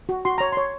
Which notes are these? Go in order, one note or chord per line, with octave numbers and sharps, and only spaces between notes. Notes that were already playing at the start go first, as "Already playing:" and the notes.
F#4
F#4 C6
C#5 A#5
C#5 C6